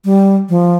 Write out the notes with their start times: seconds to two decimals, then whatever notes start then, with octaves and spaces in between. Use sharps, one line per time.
0.05 G3
0.49 F3